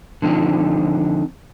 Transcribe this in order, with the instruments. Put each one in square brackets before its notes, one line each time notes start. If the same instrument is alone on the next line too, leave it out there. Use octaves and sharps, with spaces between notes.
[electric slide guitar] D3 F3 C4 D#4